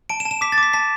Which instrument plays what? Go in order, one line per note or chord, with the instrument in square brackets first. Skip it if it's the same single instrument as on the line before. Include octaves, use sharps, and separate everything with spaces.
[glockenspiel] A5 D7
E7
A5
E7
D6 B6
A6
D6 B6
A5 B6